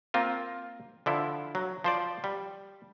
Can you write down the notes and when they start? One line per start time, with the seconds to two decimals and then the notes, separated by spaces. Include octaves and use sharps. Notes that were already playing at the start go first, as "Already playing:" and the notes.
0.14 A#3 C4 F4
1.06 D3 F3 E4
1.55 F#3
1.84 F3 C5 D5
2.24 G3